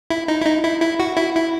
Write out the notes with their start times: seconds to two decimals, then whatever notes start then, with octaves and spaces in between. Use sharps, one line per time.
0.10 E4
0.28 D#4
0.41 E4
0.46 D#4
0.64 E4
0.82 E4
1.00 F#4
1.17 E4
1.35 E4